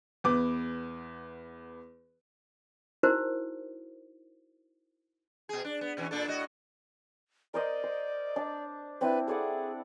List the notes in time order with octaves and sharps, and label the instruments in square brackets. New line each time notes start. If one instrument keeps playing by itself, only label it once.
[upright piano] E2 B3 D6
[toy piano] D#4 E4 F#4 A#4 C5
[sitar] B2 G#4
D4
B3
B2 E3 C#4
A#2 D4 A4
A2 F#4 D#5
[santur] A#4 C5 D#5 [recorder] D5
[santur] C5
D4 A5
[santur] C4 D4 E4 [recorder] B4
[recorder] G#4 [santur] A4 D5 F#5